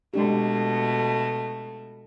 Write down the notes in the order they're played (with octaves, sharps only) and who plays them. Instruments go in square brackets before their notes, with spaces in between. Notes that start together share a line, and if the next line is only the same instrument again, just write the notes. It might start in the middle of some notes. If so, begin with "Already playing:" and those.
[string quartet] B2 A3 [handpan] G#3 D4 G4